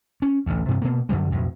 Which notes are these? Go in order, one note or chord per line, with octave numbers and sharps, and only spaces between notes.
C#4
A1 D2
G2 C3
B2 A#3
F#2 D3 F#3 G3
B1 F2 A2